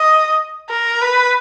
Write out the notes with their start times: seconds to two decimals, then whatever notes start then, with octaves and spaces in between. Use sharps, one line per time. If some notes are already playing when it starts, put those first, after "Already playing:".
Already playing: D#5
0.70 A#4
1.01 B4